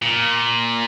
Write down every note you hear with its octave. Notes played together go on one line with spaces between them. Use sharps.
A#2